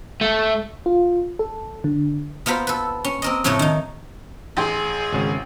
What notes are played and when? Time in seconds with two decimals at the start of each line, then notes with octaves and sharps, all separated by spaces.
0.21 A3
0.86 F4
1.39 A4
1.84 D3
2.46 B3 F4 A#4 C5 B5
2.67 A4 B4
3.04 C#4
3.22 C4 A#4 D#5
3.44 F2 A2 C#3 A3 C#5
3.59 D#3 D#4
4.57 A1 G4 G#4 C6
5.13 G#1 C#3